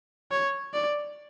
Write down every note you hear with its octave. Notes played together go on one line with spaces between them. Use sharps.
C#5
D5